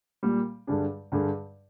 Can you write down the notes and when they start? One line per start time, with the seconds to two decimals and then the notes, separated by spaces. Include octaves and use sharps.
0.23 A#2 G3 A#3
0.67 G2 D3 G3 D4 G#4
1.12 G2 D3 G3 D4 G#4